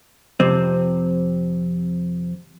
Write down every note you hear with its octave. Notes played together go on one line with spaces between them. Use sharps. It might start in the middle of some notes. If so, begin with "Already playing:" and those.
F2 C3 C4